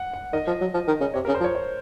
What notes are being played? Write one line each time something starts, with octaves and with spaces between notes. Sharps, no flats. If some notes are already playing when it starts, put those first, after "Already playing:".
Already playing: F#5
F#5
D#3 D#5
F3
F#3
F3
D#3
C#3
C3 C#5
A#4
C#3
C5
F3
C#5
C#5